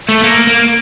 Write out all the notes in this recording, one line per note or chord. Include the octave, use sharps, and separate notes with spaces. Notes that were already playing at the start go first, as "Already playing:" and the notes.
A3
A#3
A#3